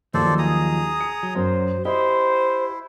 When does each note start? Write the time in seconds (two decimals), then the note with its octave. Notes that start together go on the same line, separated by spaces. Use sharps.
0.14 D#2 D#3 F3 F#3 A4 C5 D5
0.39 G#4 A#5 D#6
1.00 C#7
1.23 F#3
1.35 F#2 C5
1.85 E4 G4 C5 D#5